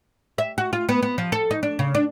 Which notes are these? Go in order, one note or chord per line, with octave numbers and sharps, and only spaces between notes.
E5
F#4
F4
B3
B3
F3
A4
D#4
D4
C#3
D4